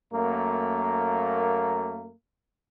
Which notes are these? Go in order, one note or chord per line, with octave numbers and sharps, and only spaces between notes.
F#2 A3 A#3